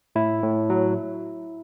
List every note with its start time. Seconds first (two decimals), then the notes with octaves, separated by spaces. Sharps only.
0.16 A2 E4
0.43 A2
0.70 F#3